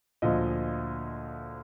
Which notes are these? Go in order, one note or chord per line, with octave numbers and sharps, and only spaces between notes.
D2 A#2 F3 D#5